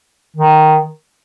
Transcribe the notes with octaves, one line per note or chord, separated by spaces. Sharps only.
D#3